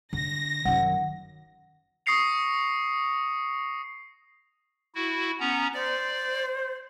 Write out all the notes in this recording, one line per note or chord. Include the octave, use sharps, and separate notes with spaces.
D3 A#6
F#2 D#3 F#5
C#6 D#6 A#6 C7 C#7 F7
E4 F#4
B3 C#4 A#5
C5 D5